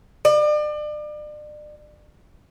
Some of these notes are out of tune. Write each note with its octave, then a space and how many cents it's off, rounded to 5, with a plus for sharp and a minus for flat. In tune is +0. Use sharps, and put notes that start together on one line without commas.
D5 +35